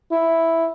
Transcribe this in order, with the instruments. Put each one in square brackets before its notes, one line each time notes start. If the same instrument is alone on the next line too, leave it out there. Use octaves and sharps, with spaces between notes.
[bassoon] E4